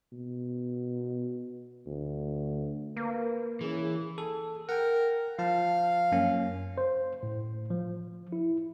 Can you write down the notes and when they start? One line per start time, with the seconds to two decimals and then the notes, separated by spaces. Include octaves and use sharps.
0.12 B2
1.86 D2
2.97 A#3 B4
3.61 E3 C#4 G#4
4.18 G#4 A4
4.69 A#4 F#5 G5
5.39 F3 F5 A5
6.12 F#2 A#3 C#4
6.78 C5
7.23 A2
7.70 F3
8.32 E4